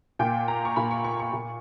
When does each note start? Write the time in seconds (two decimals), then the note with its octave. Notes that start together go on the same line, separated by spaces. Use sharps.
0.19 A#2 G5
0.48 A#5
0.65 C#6
0.76 A#2 B5
0.91 C#6
1.04 C#6
1.20 C#6
1.33 A#2